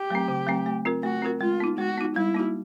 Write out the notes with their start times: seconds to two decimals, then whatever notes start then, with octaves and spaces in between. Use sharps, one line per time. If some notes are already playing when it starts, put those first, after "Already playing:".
Already playing: G4
0.10 F#3 A3 C4
0.28 C#3
0.47 F#3 A3 C4
0.66 A3
0.85 C4 F4 A#4
1.03 A3 F#4
1.22 C4 F4 A#4
1.41 G#3 F4
1.60 B3 D#4
1.78 G#3 F#4
1.97 B3 D#4
2.15 G3 E4
2.34 A#3 D#4 F#4